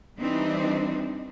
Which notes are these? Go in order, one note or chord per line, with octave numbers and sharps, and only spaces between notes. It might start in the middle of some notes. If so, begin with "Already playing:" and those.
E3 G3 C4 D4 D#4